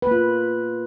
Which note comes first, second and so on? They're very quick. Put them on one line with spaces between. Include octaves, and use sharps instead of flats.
B4 A#3 F4